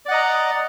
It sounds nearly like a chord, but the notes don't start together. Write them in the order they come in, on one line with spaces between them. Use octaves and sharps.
D5 F#5 D#5 A#5